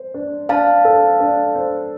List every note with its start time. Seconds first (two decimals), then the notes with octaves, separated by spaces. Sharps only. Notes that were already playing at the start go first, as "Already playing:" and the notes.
Already playing: C5
0.14 D4
0.49 D4 F5 A5
0.85 A4
1.20 D4
1.55 C5